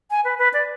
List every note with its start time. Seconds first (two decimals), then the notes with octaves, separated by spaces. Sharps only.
0.11 G#5
0.25 B4
0.39 B4
0.54 D5